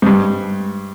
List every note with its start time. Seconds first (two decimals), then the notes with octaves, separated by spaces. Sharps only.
0.02 G#2
0.06 G2